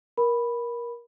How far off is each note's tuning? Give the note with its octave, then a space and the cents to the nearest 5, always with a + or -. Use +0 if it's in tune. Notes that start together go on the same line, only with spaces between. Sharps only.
A#4 +20 B5 +0